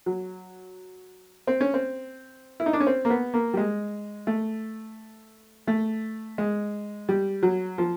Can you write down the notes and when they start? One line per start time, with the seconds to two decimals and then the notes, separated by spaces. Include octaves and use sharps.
0.06 F#3
1.47 C4
1.61 C#4
1.74 C4
2.60 E4
2.66 D#4
2.73 D4
2.80 C#4
2.87 C4
3.05 A#3
3.10 B3
3.34 A#3
3.54 G3
3.57 G#3
4.27 A3
5.67 A3
6.38 G#3
7.09 G3
7.43 F#3
7.78 F3